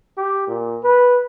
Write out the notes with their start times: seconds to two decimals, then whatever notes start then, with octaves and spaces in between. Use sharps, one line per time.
0.17 G4
0.47 A#2
0.84 B4